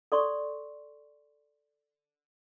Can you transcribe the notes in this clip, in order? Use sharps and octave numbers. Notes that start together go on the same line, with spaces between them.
A4 D5 C6 C#6